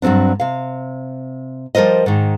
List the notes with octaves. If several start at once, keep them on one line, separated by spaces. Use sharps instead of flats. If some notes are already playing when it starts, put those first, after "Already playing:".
G2 F#3 G#3 C4 D4
C3 F5
F3 G3 A#4 C5 D#5
G#2 D#3